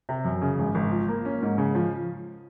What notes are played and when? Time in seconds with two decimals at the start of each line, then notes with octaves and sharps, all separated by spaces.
0.09 C3
0.25 F#2
0.42 C#3
0.59 G#1
0.75 G#1
0.91 F3
1.08 A#3
1.25 C#4
1.42 G#2
1.58 C#3
1.75 F3